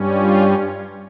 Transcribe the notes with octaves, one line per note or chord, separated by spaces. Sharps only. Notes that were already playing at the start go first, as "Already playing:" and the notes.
Already playing: G2 G3 C#4
F4